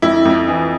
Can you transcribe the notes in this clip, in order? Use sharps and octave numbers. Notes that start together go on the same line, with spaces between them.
F2 E4
F2
E3